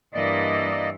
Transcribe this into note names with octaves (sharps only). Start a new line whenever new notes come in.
G2 E3 A#3 D5 D#5